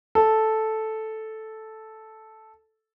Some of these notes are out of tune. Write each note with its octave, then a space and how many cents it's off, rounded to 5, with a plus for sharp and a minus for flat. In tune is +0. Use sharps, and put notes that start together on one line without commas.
A4 -5